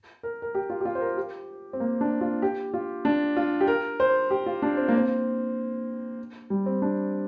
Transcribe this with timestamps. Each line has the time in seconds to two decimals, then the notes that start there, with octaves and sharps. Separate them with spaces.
0.23 A#4
0.42 A#4
0.55 G4
0.70 F4
0.81 G4
0.85 F4
0.95 C5
1.01 A#4
1.17 G4
1.73 C4
1.80 A#3
2.01 D4
2.21 F4
2.42 G4
2.74 F4
3.05 D4
3.37 F4
3.61 G4
3.67 A#4
4.00 C5
4.31 G4
4.46 F4
4.62 D4
4.77 C4
4.88 A#3
4.98 C4
6.50 G3
6.66 C4
6.82 D4